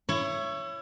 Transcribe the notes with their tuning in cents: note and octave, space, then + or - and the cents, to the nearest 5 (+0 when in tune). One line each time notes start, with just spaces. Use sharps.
E4 +30 C#5 +0